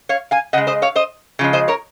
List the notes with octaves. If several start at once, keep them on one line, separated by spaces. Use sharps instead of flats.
C#5 F5
F5 G#5
C#3 G#3 D#5 F#5
C5 D#5
C#5 F5
C5 D#5
C#3 F3 G#3
C5 D#5
A#4 C#5